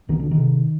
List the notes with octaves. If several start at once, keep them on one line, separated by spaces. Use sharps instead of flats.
C2 D#3
D3
D#3
C3